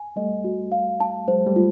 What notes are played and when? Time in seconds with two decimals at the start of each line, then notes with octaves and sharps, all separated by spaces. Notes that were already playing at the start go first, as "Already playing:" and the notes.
Already playing: G#5
0.16 G3 A3 D#5
0.44 F#4
0.72 F5
1.00 A5
1.28 F#3 G#3 C5
1.46 G3 A3
1.56 F4